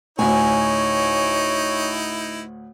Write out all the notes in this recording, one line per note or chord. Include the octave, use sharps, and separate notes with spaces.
D2 A2 D#4 E4 C#5 G#5